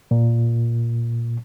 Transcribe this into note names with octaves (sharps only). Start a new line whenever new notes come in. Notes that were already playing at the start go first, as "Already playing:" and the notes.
A#2